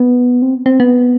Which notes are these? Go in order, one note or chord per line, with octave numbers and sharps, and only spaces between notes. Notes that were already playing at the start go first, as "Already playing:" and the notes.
Already playing: B3
C4
C4
B3